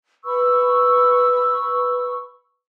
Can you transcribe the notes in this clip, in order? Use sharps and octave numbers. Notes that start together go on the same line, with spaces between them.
B4 B5 C#6 E6